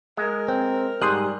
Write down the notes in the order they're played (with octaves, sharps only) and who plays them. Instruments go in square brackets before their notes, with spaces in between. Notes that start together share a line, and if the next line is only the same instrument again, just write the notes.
[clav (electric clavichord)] G#3 [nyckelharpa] A#4
[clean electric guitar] C4
[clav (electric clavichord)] G#2 [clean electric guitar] G3 [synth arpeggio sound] C6 D#6 F#6